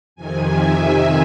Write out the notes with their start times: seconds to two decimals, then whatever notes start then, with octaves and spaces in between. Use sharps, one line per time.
0.16 F2 C3 D#3 G#5
0.51 E5